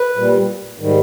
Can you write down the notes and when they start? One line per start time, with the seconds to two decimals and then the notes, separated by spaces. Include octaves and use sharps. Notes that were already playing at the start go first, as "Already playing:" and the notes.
Already playing: B4
0.16 A#2 G3
0.78 G#2 D#3 G3